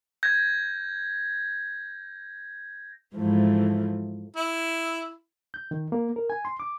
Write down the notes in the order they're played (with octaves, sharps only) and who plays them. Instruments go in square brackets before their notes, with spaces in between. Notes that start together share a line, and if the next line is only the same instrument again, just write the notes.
[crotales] G6 G#6 A#6
[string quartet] G#2 E3 F3 A3
[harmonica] E4
[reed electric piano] G6
D#3
A#3
A#4
G#5
C6
D6